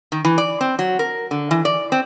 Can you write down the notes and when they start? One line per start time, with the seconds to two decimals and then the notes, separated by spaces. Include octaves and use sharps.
0.12 D#3
0.25 E3
0.38 D5
0.61 C4
0.79 F#3
0.99 A#4
1.31 D3
1.51 E3
1.65 D5
1.92 C4